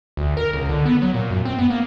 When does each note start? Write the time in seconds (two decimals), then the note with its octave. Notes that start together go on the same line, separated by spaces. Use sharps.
0.17 D2
0.37 A#4
0.53 C#2
0.69 D3
0.86 B3
1.02 F#3
1.14 A#2
1.30 F#2
1.45 C4
1.59 B3
1.70 A#3